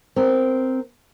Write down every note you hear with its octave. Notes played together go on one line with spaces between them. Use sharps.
C4 A#4